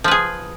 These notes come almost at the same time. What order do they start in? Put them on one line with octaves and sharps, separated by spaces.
F3 B4 G#4